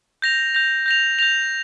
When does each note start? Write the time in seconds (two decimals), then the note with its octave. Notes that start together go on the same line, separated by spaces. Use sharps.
0.22 G6 A#6 F7
0.55 G6 A#6 F7
0.86 G6 A#6 F7
1.19 G6 A#6 F7